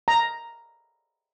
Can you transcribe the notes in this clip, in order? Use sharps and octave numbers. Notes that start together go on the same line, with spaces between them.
A#5